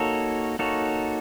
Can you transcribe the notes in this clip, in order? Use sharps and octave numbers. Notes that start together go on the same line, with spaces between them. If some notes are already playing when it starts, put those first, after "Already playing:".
Already playing: A#3 D#4 F#4 A4 C#5
A#3 D#4 F#4 A4 C#5